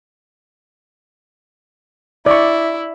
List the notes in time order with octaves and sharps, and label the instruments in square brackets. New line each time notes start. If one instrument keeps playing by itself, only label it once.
[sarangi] E4 [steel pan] D5 C#6